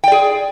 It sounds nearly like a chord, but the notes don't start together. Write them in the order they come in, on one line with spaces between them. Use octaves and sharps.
G5 D5 G#4